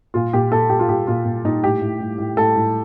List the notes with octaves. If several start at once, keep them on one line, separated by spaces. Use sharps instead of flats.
A#2 F4
A#2 G4
A#2 A4
A#2 G4
F4
A#2 G4
A#2 F4
A#2
A#2 D#4
A2 G4
A2
A2
A2
A2 A4
A2